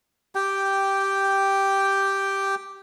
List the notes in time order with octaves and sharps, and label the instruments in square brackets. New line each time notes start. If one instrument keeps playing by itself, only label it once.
[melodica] G4 G5